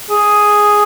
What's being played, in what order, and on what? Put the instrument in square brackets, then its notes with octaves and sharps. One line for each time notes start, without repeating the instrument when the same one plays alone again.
[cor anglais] G#4